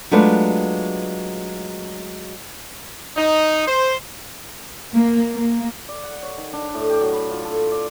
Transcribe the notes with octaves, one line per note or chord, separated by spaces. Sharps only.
F#3 G#3 A3 D4 F4 B4
D#4
C5
A#3
A#3
D5
F#5
C#5
D#3
D4
A2
G4
F#3
B5
F4
A4
D5